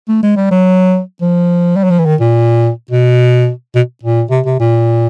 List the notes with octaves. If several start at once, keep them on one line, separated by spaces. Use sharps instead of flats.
A3
G#3
G3
F#3
F3
G3
F#3
F3
E3
D#3
A#2
B2
B2
A#2
C3
C3
A#2